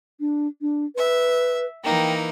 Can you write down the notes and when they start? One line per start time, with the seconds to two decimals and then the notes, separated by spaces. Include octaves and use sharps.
0.20 D4
0.61 D4
0.96 B4 E5
1.84 E3 A#3 D#4 G5